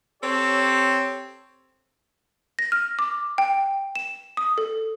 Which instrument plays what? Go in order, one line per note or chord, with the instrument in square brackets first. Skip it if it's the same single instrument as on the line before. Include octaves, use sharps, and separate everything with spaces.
[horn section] C4 G4 A4 C#5
[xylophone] A#6
F6
D6
G5
E7
D#6
A4